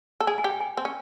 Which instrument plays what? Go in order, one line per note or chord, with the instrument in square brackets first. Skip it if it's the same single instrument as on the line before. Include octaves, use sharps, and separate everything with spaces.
[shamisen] A4
[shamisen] G#4 [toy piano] G#5
[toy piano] G#5
[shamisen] G4
[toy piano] G5
G#5
[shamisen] C4
C#4